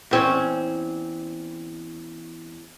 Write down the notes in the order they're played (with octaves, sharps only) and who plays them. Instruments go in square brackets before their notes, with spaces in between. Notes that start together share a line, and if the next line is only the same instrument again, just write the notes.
[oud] E2 C4 C#4